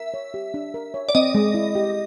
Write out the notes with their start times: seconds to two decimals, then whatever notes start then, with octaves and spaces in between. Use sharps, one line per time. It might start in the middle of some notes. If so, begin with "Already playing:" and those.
Already playing: A#4 E5
0.14 C#5
0.34 G4
0.54 D4
0.74 A#4
0.94 C#5
1.09 D5
1.15 C4 D#5
1.35 G#3
1.54 E4
1.75 G4